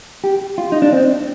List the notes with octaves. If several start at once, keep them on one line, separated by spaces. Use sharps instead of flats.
G4
F4
D#4
D4
C4